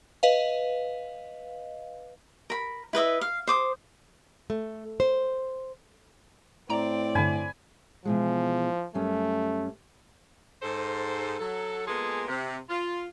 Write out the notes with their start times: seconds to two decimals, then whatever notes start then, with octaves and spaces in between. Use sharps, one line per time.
0.23 B4 D#5 F5
2.50 A#4 B5
2.93 E4 B4 D#5 E5
3.21 F5
3.47 C5 D6 D#6
4.50 A3
5.00 C5
6.70 A2 C4 D5 G5 A#5
7.15 G2 D3 G#5 B5
8.05 B2 E3 F3 G#3
8.95 F#2 G3 A3 C#4
10.62 G#2 A4 C5
11.39 F#3 A4
11.87 G#3 A#3 B3 F4 G#4 A4
12.28 C3
12.69 F4